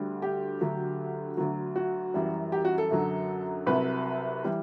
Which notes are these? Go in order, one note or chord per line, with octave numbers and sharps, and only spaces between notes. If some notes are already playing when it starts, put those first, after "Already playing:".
Already playing: D2 D3 G3
G4
D2 D3 F#3
D2 D3 F#3
F#4
F#2 E3 G3
G4
F#4
A4
F#2 D3 F#3
C2 C3 F#3 B4
E3 G3